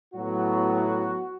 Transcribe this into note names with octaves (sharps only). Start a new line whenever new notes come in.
A2 F#3 B3 F#4